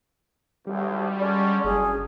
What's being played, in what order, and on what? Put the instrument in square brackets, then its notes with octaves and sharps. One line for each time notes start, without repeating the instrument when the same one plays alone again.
[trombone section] G#1 D2 [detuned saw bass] G3
[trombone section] D3 G#3 C#4 [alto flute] D5
[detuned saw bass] F#1 [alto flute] G#4